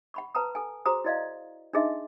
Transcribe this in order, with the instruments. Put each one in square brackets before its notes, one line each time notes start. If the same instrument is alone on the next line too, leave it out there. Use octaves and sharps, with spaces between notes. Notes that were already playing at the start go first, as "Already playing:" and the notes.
[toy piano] F#5 B5 C#6
B4 F#5 A5 A#5 D#6
A4 F#5 G#5
F#4 G#4 C5 A#5 D#6
E4 F#4 D5 D#5 F5
D4 D#4 G#4 D#5 E5 C6